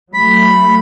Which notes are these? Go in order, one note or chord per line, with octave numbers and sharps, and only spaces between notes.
F#3 A3 B5